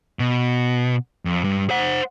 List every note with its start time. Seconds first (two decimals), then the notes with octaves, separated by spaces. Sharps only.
0.19 B2
1.25 F2
1.44 G2
1.70 C5 F#5